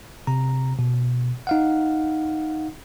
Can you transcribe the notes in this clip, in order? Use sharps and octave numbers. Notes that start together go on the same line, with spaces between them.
C3 A#5
B2
D#4 F5 F#5